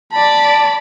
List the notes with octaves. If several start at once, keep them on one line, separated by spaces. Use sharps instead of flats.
D5 A5 B5